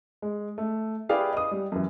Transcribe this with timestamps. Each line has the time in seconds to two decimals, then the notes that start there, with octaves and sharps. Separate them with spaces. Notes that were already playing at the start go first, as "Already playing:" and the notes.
0.22 G#3
0.58 A3
1.09 E4 G4 G#4 B4 D5 F5
1.33 D#5 D#6
1.51 G3
1.72 F#2 E3